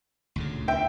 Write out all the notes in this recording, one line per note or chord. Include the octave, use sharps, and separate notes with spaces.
D2 A#2 C#3
E5 G5